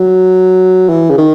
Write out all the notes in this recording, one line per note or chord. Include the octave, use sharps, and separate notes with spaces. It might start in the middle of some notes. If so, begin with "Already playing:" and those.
Already playing: F#3
E3
C#3
D#3